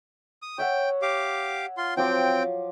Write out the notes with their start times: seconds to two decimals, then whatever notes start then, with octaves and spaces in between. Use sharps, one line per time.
0.42 D#6
0.58 C#5 E5 F#5 G5
1.02 G4 F5 D6
1.77 F4 C6
1.97 F3 F#3 C4 G5 D6